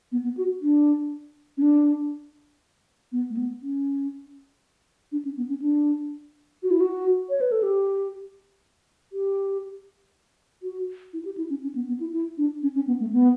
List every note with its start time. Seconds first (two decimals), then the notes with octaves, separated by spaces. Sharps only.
0.12 B3
0.24 B3
0.37 F#4
0.62 D4
1.57 C#4
1.62 D4
3.12 B3
3.30 A3
3.37 B3
3.62 C#4
5.12 D4
5.25 C#4
5.37 B3
5.49 C#4
5.62 D4
6.63 F#4
6.71 E4
6.80 F#4
7.29 C#5
7.41 B4
7.52 A4
7.63 G4
9.13 G4
10.63 F#4
11.13 E4
11.25 G4
11.37 E4
11.50 C#4
11.63 C#4
11.75 B3
11.88 B3
12.00 E4
12.13 E4
12.38 D4
12.63 C#4
12.75 C#4
12.87 B3
13.00 A3
13.13 B3